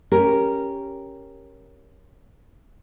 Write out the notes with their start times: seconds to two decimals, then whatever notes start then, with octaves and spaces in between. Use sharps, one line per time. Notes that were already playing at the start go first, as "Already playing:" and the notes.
0.11 C#4 G4 A#4